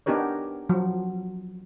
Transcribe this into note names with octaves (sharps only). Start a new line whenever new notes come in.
B3 D4 D#4 G4 A#4 C#5
F3 F#3